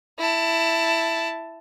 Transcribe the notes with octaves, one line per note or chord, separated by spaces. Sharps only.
E4 A5